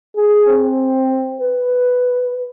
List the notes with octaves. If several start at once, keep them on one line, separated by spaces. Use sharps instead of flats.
G#4
C4
B4